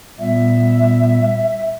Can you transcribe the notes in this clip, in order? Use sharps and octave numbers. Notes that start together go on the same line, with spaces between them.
A#2 G3 B3 E5